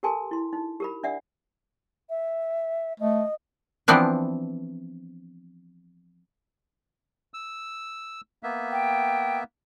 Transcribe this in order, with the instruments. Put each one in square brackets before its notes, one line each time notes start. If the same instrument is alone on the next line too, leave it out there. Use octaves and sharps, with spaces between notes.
[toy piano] G4 A4 A#4 G#5 A5 C6
E4 C6
D#4
G4 A#4 B5
D4 D5 E5 F#5
[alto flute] E5
[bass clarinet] A3 [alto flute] D#5
[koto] E3 F3 B3 C4 D4
[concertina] E6
A#3 B3 E5
[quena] G5